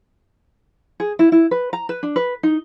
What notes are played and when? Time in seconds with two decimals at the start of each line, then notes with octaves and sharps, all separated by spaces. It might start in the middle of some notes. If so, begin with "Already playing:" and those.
1.00 G#4
1.19 E4
1.32 E4
1.51 B4
1.73 A#5
1.89 B4
2.03 D4
2.16 B4
2.43 D#4